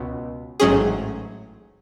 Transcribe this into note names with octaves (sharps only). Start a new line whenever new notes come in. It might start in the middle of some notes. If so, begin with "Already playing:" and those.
Already playing: C#2 B2
A1 G#2 F#3 C#4 G#4